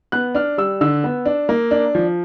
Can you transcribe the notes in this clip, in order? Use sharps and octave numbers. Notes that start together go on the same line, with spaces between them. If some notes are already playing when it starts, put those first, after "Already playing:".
B3 F#6
D4 F6
G3 E6
D3 E6
B3
D4
A#3
D4
F3